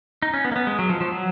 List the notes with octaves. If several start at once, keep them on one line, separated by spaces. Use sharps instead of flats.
D#4
C#4
B3
A#3
B3
G#3
F#3
F3
F3
F#3